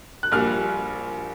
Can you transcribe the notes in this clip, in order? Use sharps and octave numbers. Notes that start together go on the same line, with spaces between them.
F#6
A#1 A#2 G3 F6